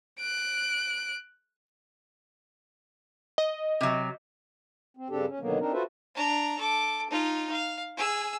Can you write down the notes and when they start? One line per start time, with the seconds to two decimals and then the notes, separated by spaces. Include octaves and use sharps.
0.20 F#6 D7
3.38 D#5
3.81 C3 F#3
4.97 C4
5.10 G2 C#3 C4 D4 G4 A4
5.28 C#4
5.40 B2 D3 D#3 F#3 A#3 B3
5.59 C4 D4 D#4 A#4
5.72 F4 F#4 A4 B4 C5 E5
6.15 D4 A#5
6.58 A4 D6
7.09 D#4 F4
7.51 F5
7.97 G#4 E6